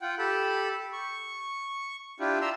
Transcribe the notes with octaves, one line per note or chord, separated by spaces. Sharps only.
F4 F#5 G5
G4 A4 A5 B5
C#6
D4 E4 F4 G4
D5 E5 A#5 C6 E6